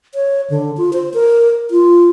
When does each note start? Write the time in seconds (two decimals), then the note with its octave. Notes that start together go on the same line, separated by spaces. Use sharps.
0.15 C#5
0.50 D3
0.77 F4
0.93 C5
1.14 A#4
1.71 F4